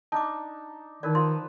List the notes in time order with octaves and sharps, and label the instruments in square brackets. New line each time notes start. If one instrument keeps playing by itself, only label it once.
[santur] D4 D#4 [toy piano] A5 D6
[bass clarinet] D#3 [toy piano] D#4 A#4 D5 [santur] B4
[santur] F3 [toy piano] C6